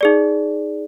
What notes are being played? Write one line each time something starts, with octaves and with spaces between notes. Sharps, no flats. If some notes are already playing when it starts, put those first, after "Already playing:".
D#4 G#4 D5